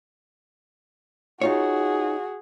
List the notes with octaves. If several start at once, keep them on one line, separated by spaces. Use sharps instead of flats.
D#4 F4 F#4 G#4 C#5